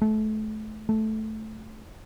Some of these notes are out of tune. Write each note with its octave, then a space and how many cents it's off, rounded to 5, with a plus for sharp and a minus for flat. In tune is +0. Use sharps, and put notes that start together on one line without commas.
A3 -30
A3 -10